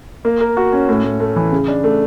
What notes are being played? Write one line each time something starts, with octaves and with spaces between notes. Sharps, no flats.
A#3
A#4
F#4
C#4
A2
A2
A3
E3
C#3
D4
A3